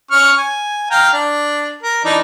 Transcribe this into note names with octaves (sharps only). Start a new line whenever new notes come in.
C#4 C#6 F6
G#5
F5 G5 A#5
D4
A#4
E3 D4 D#4